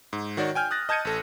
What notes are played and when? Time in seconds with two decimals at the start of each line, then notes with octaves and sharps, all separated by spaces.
0.13 G#2
0.37 D#3 F#4 C#5 D5
0.55 G5 G#5 F6 G6
0.71 D#6 F#6 A6 A#6
0.89 D#5 A5 G6 G#6 C#7 D#7
1.05 A1 A4 A#6